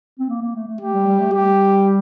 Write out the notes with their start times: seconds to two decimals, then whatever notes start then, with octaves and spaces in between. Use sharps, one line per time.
0.19 C4
0.29 A#3
0.41 A#3
0.55 A3
0.67 A3
0.81 A3 G4
0.93 G3
1.07 G3
1.20 A3
1.33 G3 G4